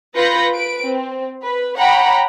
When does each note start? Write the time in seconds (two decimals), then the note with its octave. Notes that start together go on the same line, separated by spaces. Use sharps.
0.16 F4 B4 B5 G6 A#6 C#7
0.52 B4 D7
0.82 C4
1.43 B4
1.77 C#5 F#5 G5 A#5 B5